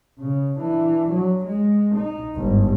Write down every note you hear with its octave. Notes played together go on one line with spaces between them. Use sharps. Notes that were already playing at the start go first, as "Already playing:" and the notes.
C#3
E3 D4
F#3
G#3
D#4
G1 G#2